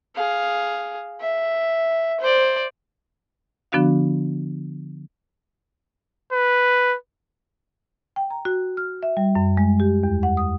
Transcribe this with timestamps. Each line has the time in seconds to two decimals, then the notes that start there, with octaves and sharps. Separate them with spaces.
0.16 G#4 F5
1.21 E5
2.21 C5 D5
3.72 D3 F3 B3 D4 F#4 F5
6.33 B4
8.16 G5
8.30 A#5
8.45 F#4
8.77 F6
9.03 E5
9.17 G3
9.35 F#2
9.57 G#3
9.80 G4
10.03 E2
10.23 F#5
10.37 D#6